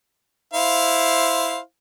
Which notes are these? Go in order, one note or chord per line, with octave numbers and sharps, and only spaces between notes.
E4 C5 F5